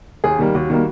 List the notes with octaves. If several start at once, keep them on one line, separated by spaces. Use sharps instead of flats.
D#2 G#4
D#3 G3 A#3
D#2 F#4
D#3 G3 A#3